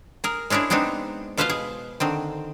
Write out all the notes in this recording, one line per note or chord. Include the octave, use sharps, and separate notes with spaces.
G#4 A#4
G#3 C#4 D4 E4 G#4
G#3 B3 C4 D4 D#4
B2 F4 B4 C5 D#5 F5
G#4
D3 D#3 C4